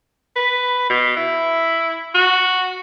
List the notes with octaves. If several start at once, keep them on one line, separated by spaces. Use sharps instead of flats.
B4
B2
E4
F#4